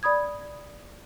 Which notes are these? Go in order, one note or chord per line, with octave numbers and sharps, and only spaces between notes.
D5 B5 D#6 G#6